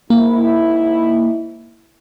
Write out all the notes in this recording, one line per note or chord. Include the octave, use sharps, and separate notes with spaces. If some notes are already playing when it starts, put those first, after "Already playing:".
G#2 A#3 E4